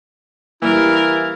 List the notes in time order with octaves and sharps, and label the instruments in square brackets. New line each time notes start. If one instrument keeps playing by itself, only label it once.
[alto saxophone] E3 [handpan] G3 A#3 [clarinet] E4 [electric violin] A#4